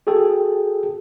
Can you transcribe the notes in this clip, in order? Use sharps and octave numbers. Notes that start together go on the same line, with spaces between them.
F#4 G#4 A4 G5